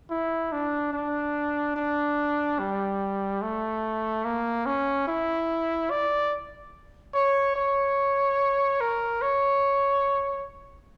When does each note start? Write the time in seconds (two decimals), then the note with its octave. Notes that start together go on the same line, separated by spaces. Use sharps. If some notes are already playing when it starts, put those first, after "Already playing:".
0.10 E4
0.52 D4
0.93 D4
1.76 D4
2.59 G3
3.42 A3
4.25 A#3
4.66 C#4
5.08 E4
5.90 D5
7.14 C#5
7.56 C#5
8.80 A#4
9.22 C#5